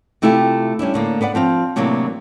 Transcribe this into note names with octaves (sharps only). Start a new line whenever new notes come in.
C3 A3 E4 F4 G4
G3 C#4 D4 E4
A2 D3 A#3
B3 B4 D5 F#5
F3 C4 F5
A2 C3 E3 F#3 A#3 D4